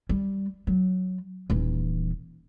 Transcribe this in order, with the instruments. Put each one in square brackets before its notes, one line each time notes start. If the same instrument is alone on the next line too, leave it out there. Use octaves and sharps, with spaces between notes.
[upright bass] G3
F#3
D#1 E3